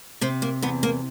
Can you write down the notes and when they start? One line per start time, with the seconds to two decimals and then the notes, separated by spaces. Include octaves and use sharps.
0.21 C3 C4
0.42 A#3
0.62 E2 B3
0.83 A#3